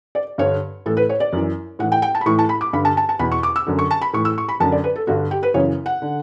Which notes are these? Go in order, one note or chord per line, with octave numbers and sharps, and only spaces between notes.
D5
G2 D3 C#5
A2 E3 A4
B4
C#5
D5
F#2 E3
A2 E3 F#5
G5
G5
A5
B5
A2 E3 C#6
A5
B5
D6
G2 D3 B5
A5
A5
A5
E2 B2 B5
C#6
D6
E6
F#2 D3
C#6
A5
B5
A2 E3 C#6
E6
C#6
B5
F#2 D3 A5
D5
B4
A4
G2 D3 F#4
G4
B4
F#2 C#3 E3 C#5
F#5
D3